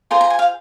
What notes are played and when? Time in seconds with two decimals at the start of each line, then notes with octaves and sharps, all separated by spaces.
0.11 F4 G#4 C5 A#5
0.21 A#5
0.30 G#5
0.39 F5